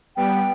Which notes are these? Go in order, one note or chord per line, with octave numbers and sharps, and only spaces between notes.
G3 B3 G5